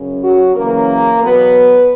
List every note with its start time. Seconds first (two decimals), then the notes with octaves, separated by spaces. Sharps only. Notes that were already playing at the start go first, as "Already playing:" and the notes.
Already playing: F#2 C#3
0.22 F#3 F#4
0.55 F#2 C#3 E3 A#3 A#4
1.22 E2 B2 F#3 B3 B4